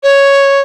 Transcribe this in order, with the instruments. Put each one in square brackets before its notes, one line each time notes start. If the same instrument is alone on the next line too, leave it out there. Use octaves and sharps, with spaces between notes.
[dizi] C#5